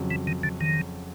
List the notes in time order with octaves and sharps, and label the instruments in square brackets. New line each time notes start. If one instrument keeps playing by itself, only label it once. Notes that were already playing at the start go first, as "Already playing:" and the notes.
Already playing: [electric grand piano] F2 C#3 F#3
[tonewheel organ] E3
D#3
D3
D#3